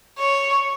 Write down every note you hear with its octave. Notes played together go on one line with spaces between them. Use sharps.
C#5